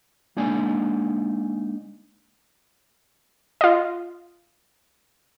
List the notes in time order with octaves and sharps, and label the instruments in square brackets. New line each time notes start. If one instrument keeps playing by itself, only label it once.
[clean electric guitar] G#3 A#3 D4 D#4 D5 G#5
[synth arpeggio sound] F4 D#5